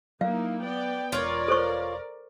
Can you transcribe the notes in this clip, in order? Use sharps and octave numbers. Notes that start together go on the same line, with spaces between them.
F#3 A#3 D#4 E4 F5
B3 D5 G5
E1 F4 A#4 C#5 D5
A4 C5 C#6